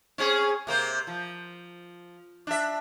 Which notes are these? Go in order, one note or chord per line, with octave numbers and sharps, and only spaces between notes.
C4 C#4 G#4
C3 A#3 C5
F3
D4 E5